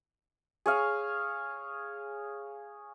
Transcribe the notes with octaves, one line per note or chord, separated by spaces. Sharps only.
G#4 C#5 F5